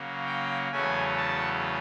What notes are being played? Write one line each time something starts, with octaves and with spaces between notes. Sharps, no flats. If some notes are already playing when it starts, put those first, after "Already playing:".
Already playing: C#3 F#3 A#3
G5
E2 C#3 F#3 A3 C#4 G#5
A5